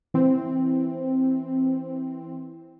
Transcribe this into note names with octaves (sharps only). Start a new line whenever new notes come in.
E3 C4